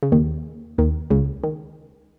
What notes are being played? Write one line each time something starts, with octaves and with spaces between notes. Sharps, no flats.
C#3
D#2 D#3
D#2 D#3
C#2 C#3
D#3